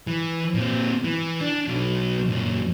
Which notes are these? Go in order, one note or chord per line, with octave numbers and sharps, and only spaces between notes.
E3
A#2 C4
E3
D4
B1 F#3
F#2 A#2